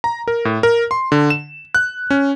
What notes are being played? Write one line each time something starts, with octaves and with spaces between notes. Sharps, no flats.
A#5
A#4
A2
A#4
C6
D3
E7
F#6
C#4